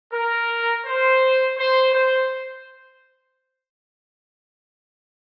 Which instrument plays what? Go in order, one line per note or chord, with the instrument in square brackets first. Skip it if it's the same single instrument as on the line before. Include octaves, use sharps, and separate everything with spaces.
[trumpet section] A#4
C5
C5
C5